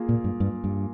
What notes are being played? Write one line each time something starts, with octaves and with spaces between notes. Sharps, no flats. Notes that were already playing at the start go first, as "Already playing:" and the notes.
Already playing: A#3 F4 G#4
A#2
G2
G2
G2